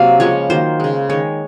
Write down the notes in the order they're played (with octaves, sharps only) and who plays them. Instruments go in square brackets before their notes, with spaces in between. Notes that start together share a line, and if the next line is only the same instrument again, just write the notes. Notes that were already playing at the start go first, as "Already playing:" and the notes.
Already playing: [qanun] C3 F#3 A#3 F5
C#3 F3 G#3 C#5
D#3 F#3 A#3 C5
C#3 G#3
D#3 G#3 C#5